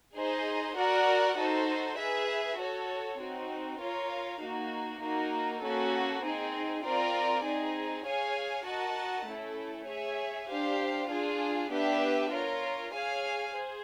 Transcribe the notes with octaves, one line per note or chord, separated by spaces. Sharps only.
D#4 G#4 C5 D#5
F#4 A#4 D5 F#5
D#4 F#4 A4 C5
G#4 B4 E5
F#4 A4 C#5
C4 D#4 F#4
F4 A#4 C#5 F5
A#3 D#4 F#4
A#3 D#4 F#4 A#4
A#3 C#4 F#4 A4
C4 D#4 G#4
C4 F4 A#4 D5
C4 D#4 G#4
G#4 C#5 F5 G#5
F#4 A#4 D#5 F#5 A5
A3 C#4 E4 A4
G#4 C#5 E5 G#5
D4 G4 C5 F5
D4 F4 G#4
B3 D4 G4 B4 E5
F4 A#4 C#5
G#4 C#5 F5 G#5
G#4 C5